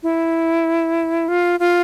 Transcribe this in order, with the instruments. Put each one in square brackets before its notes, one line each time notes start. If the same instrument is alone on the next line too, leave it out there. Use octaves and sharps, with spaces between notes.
[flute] E4
F4
F4